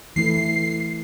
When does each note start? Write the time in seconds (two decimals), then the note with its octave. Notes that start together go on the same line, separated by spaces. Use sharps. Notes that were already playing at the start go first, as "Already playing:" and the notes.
0.16 E3 A3 E4 C7